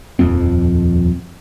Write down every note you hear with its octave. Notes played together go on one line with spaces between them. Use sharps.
D#1 F2 F3 C4